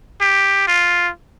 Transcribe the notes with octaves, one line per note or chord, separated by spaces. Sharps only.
G4
F4